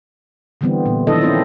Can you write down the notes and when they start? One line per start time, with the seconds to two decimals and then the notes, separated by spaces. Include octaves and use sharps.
0.61 D3 E3 G3 B3 C4
0.86 A#2 G3
1.07 D#3 F3 D4 E4 A4 D#5
1.21 C4 C#4 E4 F4 C5